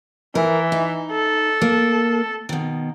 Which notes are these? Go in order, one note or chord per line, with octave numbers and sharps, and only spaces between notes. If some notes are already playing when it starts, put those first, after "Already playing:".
E3 A#4
D#4
A4
A#3
B2 D#3